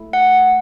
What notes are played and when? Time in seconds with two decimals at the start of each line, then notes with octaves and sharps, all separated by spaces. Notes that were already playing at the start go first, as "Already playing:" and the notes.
Already playing: A3 E4 A4
0.13 F#5